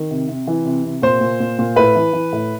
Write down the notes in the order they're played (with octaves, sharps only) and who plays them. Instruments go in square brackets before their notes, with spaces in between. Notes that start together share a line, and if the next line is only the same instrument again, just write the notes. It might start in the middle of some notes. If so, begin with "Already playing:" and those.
Already playing: [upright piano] D#3
C3
C3
E3
C3
C3
A#2 C5
A#2
A#2
A#2
A2 B4
E3
E3
A2